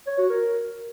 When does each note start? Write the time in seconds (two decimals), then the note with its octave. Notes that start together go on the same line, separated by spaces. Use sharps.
0.07 C#5
0.18 F#4
0.30 A#4